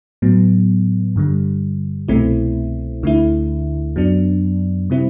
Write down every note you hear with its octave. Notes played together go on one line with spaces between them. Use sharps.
A2 F#3 B3
G2 D3 G3
C2 B2 A3 C4 E4
D2 D3 A3 E4
F#2 F#3 B3 D4
C3 G3 C4 E4